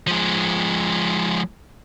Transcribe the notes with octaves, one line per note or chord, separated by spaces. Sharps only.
F3 G#3